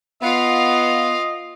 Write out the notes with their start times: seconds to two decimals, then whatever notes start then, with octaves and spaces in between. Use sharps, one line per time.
0.22 B3 F4 D#5 F5